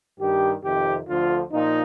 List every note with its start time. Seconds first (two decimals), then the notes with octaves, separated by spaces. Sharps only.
0.19 G2 D#3 G4
0.63 F2 C3 D#3 G4
1.07 D2 D3 F3 F4
1.51 A#2 F3 D#4